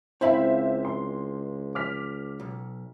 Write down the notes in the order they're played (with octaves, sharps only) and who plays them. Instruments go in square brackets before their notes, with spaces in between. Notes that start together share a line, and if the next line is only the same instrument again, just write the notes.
[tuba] C#2 [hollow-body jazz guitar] C4 E4 B5 [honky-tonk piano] C5 E5 F5
[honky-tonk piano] C6
D6 F6 B6
[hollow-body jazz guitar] B1